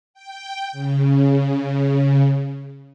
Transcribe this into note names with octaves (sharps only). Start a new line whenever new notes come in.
G5
C#3